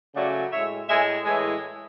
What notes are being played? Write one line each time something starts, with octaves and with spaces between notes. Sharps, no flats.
C#3 F#3 A3 D5 F#5
A2 G#3 C#5 E5
A2 G#3 E5 G#5
A2 E3 G#3 E5 G#5